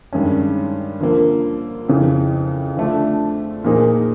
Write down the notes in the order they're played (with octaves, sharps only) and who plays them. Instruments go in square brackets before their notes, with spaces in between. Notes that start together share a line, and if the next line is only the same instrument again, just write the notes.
[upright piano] G2 D#3 G#3 C#4
D3 F3 A#3
F2 C#3 E3
D3 F3 A3 D4
A#2 F3 A#3 D#4 G#4